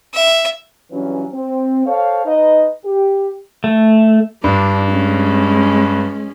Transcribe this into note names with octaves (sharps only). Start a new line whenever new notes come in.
E5
G2 E3 F#3 C#4
C4
A4 C5 C#5 F5
D#4 B4 D#5
G4
A3
G2 D4
G#3 C#4